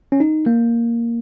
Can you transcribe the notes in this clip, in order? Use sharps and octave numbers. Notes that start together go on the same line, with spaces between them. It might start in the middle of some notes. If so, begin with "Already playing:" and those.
C#4
D#4
A#3